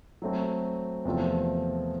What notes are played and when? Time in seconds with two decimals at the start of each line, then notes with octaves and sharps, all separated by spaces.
0.22 F#3 A3 C4
1.05 E2 C3 F3 A3 C4